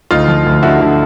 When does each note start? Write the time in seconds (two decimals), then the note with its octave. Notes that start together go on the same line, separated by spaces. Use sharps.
0.11 D2 D#4 F4
0.28 F3
0.46 D2
0.63 D3 E4 F#4
0.81 D3